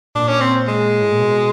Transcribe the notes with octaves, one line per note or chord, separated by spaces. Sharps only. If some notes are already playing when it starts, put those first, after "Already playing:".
A#2 D4
C#4
C4
G#3
A2
A#2
B2